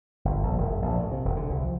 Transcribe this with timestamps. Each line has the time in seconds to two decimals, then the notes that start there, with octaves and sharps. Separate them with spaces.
0.25 G1
0.43 A#1
0.58 E1
0.70 F#2
0.82 A#1
0.98 A2
1.12 C3
1.25 E1
1.37 D3
1.50 C2
1.64 F3